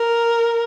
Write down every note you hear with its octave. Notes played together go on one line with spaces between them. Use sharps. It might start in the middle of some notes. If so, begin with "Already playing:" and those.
Already playing: A#4